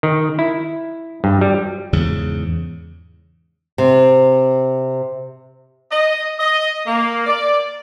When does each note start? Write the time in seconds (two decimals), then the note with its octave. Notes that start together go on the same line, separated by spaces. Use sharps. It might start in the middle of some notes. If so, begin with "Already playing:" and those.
0.03 D#3
0.39 E4
1.24 G2
1.41 G3
1.93 E2 G#2 C#3
3.78 C3
5.90 D#5
6.39 D#5
6.86 A#3
7.26 D5